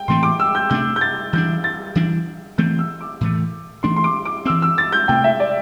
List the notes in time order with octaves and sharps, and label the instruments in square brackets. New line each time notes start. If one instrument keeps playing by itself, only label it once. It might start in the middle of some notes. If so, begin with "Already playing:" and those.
Already playing: [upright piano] G5
[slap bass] A2 E3 A3 C4 [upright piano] C6
[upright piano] D6
E6
G6
[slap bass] C3 A3 D4 [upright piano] G6
[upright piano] G6
A6
[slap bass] E3 G3 D4 [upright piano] G6
[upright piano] A6
[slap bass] E3 G3 D4
[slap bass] E3 A3 C4 [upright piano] G6
[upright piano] E6
D6
[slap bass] A2 E3 A3
[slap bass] E3 A3 D4 [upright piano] C6
[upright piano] C6
D6
D6
[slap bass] C4 [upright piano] E6
[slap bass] E3
[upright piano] E6
A6
G6
[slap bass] C3 A3 C4 [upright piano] G5
[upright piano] E5
D5